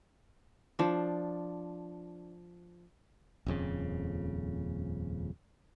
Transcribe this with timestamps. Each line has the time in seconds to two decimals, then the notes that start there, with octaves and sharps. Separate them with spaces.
0.79 F3 D4
3.46 D#1 F2 C#3